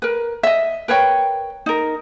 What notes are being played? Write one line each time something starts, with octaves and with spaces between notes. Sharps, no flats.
A#4 B4
D#5 E5
A#4 B4 C#5 G5
D#4 A#4